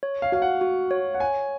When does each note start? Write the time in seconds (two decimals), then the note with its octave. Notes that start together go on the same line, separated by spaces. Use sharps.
0.03 C#5
0.22 F5
0.32 F#4 F5
0.42 F#5
0.61 F#4
0.91 C#5
1.14 F#5
1.20 C#5 G#5